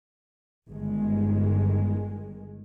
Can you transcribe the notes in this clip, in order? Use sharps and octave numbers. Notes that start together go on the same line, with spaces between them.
G1 D#3 G#3